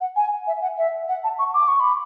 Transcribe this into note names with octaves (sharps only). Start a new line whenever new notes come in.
F#5
G#5
E5
F#5
E5
F#5
A5
C#6
D6
C#6
B5